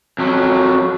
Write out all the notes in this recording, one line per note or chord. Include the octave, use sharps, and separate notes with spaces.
F2 F#3